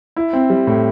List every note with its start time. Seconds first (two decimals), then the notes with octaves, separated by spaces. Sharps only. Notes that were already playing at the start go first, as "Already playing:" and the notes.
0.16 E4
0.33 C4
0.50 G3
0.67 A2